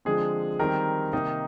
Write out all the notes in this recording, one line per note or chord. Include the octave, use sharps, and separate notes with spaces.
D3 F3 G#3 C4 G#4
D#3 G3 C4 A#4
C3 D#3 A#3 D#4